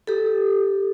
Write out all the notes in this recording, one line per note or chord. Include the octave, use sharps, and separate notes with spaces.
G4 A4